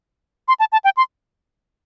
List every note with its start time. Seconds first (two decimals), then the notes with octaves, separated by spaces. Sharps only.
0.48 C6
0.60 A5
0.72 A5
0.84 G5
0.97 C6